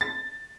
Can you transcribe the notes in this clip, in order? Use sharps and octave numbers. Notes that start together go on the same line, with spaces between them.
A6